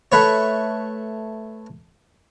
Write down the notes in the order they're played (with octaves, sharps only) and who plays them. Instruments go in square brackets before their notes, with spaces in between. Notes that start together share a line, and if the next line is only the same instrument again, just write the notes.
[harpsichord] A3 B4 C#5